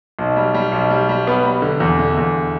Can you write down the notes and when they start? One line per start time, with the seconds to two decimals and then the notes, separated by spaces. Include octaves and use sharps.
0.19 B1
0.36 G3
0.54 G3
0.72 B1
0.90 G3
1.09 G3
1.27 B3
1.45 G3
1.62 D3
1.80 E2
1.99 D3
2.17 E2